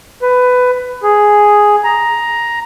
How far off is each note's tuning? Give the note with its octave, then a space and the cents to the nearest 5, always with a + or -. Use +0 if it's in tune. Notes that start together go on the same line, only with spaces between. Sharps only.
B4 +15
G#4 +0
A#5 +10